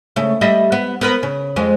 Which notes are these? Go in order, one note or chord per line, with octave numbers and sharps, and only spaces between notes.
C#3 A3
G3 D#5 E5
B3
B3 A#4 B4
C#3
F2 G#3